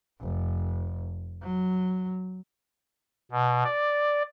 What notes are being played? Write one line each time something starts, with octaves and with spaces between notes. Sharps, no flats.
F1
F#3
B2
D5